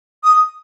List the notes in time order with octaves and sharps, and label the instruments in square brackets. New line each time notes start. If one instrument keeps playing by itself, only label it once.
[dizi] D#6